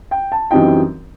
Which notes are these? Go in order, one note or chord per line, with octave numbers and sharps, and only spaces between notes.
G5
A5
F#2 E3 G3 C4 D#4 G5